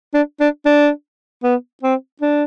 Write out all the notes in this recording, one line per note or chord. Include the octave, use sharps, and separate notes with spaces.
D4
D4
D4
B3
C4
D4